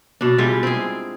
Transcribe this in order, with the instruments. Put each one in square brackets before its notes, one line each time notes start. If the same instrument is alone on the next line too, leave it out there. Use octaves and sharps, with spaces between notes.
[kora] B2 D4
G3 G#3 E4 F4
C4 G#4